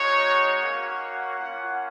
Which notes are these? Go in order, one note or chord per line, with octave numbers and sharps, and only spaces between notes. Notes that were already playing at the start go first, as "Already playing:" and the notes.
Already playing: G#3 D#4 F#4 C#5
A#3 C#4 F#4 F#5
A#3 C#4 F4 F#5